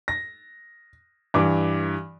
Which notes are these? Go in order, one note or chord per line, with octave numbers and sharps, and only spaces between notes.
A#6
G2 E3 D6